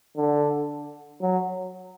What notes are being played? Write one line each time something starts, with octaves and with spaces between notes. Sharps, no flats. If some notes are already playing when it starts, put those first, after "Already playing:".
D3
F#3